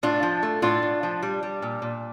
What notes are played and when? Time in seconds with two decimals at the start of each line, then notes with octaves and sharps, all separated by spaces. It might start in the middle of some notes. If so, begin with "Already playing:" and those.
0.03 A2 D4 F4
0.23 F3
0.43 A3
0.62 A2 D4 F4
0.82 A2
1.03 F3
1.23 G3
1.43 G3
1.62 A#2
1.82 A#2